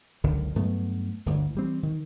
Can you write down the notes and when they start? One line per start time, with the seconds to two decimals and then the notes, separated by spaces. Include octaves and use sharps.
0.24 F#1 C#2 D3 D#3
0.56 G2 F#3 A3 B3
1.26 G1 D2 D3
1.55 E3 G3 C4
1.83 D#3